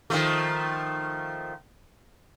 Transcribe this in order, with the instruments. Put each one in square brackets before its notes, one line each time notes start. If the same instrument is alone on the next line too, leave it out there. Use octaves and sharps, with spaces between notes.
[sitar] D#3 F3 A3